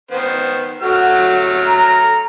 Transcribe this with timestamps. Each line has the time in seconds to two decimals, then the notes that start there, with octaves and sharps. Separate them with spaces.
0.11 D#3 B3 C5
0.82 F#3 A3 F#4 F6
1.66 A#5